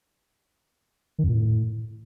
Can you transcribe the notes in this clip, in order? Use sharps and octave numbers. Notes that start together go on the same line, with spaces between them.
D#3
F2
A#2
A2